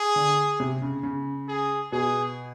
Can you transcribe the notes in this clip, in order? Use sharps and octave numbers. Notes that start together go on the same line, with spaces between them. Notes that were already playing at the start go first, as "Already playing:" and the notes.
Already playing: G#4
D3
C3
C#3
C#3
G#4
B2 G#4